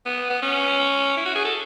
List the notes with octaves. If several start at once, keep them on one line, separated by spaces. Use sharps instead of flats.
B3
B3
C#4
E4
F#4
G#4
A4